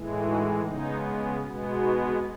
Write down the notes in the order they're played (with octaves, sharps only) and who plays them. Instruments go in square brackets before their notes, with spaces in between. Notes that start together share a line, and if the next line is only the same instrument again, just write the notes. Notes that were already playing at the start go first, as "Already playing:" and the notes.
Already playing: [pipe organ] A2 E3 G#3
D#4 F#4
C#3 G#3 B3 D#4
B2 G#3 B3
D#4 F#4